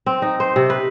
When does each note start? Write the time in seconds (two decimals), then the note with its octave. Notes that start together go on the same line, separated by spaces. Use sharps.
0.06 C4
0.22 D#4
0.40 C5
0.56 C3
0.70 B4